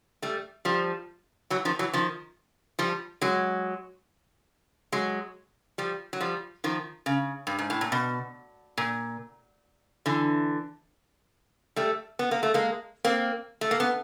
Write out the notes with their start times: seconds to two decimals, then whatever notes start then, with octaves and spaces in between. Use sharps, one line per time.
0.22 G3 A3
0.65 F3 G3
1.50 E3 F#3
1.65 D#3 F3
1.79 E3 F#3
1.93 D#3 F3
2.79 F3 G3
3.21 F#3 G#3
4.92 F#3 G#3
5.78 F3 G3
6.13 F#3
6.20 F3 G3
6.64 D#3 F3
7.06 C#3
7.47 G2
7.59 G#2
7.70 A2
7.81 A#2
7.92 B2
8.78 A#2
10.06 D3 E3
11.76 G3 A3
12.19 B3
12.31 A#3
12.43 A3
12.54 G#3 A#3
13.05 A#3 C4
13.61 A3
13.71 A#3
13.80 B3